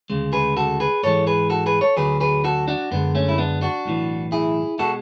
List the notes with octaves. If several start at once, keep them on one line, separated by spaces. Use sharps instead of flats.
D2 C#3 G#3
G#4 B4
F#4 A4
G#4 B4
G#2 E3 G#3 A4 C#5
G#4 B4
F#4 A4
G#4 B4
A4 C#5
D2 D3 F#3 G#4 B4
G#4 B4
F#4 A4
D4 F#4
F#2 D3 G#3 B3
A3 C#4
E4
B3 D4
D4 F#4
B1 A2 E3
E4 G#4
B2 G#3 F#4 A4